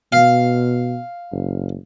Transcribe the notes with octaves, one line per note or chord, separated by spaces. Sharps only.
B2 F5
F#1